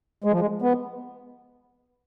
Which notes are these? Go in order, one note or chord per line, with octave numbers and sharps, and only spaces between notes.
G#3
F3
G#3
B3